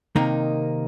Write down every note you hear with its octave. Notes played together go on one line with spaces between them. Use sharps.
C3 D#3 A#3 D#4